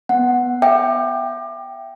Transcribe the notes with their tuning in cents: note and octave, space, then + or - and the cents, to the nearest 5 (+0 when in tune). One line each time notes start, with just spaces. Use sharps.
B3 +0 F#5 +0
E5 +25 G5 +0 D6 +30